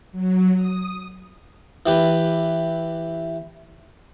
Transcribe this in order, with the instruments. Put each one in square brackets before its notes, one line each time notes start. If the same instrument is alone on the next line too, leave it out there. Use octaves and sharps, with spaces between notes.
[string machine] F#3
D#6
[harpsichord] E3 G4 B4